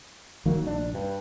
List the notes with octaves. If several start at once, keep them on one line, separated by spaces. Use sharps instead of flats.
D#3 F#3 A#3
F1 A#1 D4
G2